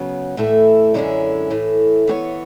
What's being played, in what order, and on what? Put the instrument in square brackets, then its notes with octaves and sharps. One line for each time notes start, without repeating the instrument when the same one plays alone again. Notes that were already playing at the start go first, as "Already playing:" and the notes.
Already playing: [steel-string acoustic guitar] C#3 F#3 B3
A2 E3 A3 E4
F#2 D3 G#3 C#4 E4
A2 E3 A3
E3 B3 F#4 C#5